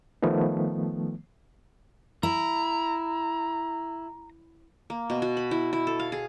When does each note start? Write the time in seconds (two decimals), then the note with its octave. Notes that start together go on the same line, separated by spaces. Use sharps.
0.22 D#3 F3 A3 B3
2.23 E4 A#5
4.90 A#3
5.10 B2
5.22 F#4
5.37 B5
5.51 E4
5.73 E4
5.87 A4
5.99 F5
6.12 G#4